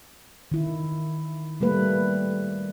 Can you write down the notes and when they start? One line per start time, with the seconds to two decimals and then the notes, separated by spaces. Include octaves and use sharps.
0.52 D#3 E4
1.61 G3 A3 A#3 B4